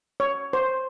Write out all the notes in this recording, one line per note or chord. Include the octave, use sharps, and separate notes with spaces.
C#5
C5